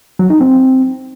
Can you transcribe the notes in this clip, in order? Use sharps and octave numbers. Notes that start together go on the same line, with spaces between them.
F#3
D#4
C4